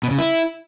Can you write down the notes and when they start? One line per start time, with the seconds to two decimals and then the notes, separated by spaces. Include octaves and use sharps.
0.03 B2
0.11 C#3
0.18 E4